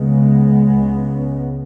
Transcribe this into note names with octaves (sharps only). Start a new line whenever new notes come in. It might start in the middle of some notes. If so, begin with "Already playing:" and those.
Already playing: C#2 C#3 G#3 B3
C#2 C#3